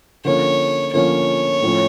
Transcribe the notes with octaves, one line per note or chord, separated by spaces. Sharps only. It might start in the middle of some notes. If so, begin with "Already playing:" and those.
D3 F3 A#3 C#4 C#5
D3 F3 A#3 C#4 C#5
A2 F3 A3 C#4